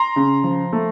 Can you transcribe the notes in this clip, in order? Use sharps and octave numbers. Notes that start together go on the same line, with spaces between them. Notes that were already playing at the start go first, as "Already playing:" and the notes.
Already playing: A#5 C6
C#3
F3
A3